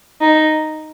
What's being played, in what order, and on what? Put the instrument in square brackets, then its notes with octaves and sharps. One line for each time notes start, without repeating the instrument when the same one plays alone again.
[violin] D#4